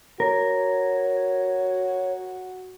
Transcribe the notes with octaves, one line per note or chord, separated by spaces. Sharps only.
F#4 A#4 C#5